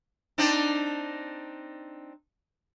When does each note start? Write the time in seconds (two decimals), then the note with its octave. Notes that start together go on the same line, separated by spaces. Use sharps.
0.38 C4 D4 D#4